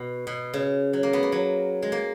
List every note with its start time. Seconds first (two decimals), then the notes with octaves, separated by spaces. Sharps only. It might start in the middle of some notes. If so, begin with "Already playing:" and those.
Already playing: B2
0.27 B2
0.54 C#3
0.93 F#3
1.03 A#3
1.13 B3
1.23 A#3
1.32 F#3
1.82 G#3
1.92 A#3